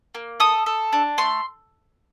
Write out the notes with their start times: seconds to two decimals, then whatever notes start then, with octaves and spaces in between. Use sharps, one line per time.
0.15 A#3
0.40 A4 D#6
0.66 A4
0.93 D4
1.18 A3 C6